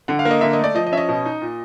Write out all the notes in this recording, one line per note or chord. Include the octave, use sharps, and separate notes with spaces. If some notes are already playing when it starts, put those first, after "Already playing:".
D3 F#5
F5
A#3
D#5
D3 E5
D#5
A3
D5
F3 D#5
D#5
C#4 E5
D#5
B2
D#4
A#2